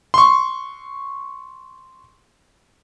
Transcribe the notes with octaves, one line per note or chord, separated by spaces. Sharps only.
C6 C#6